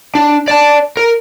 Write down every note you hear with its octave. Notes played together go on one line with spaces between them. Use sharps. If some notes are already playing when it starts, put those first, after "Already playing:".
D4
D5 A5
A#4